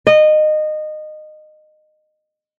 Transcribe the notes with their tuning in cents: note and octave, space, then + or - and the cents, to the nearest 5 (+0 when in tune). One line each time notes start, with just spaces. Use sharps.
D#5 -20